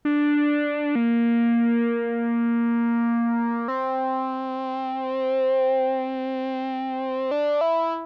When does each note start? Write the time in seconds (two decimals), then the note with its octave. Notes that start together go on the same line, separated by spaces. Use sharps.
0.05 D4
0.95 A#3
3.68 C4
7.31 D4
7.61 E4